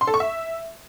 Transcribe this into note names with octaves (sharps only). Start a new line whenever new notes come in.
C6
A4
C#6
E5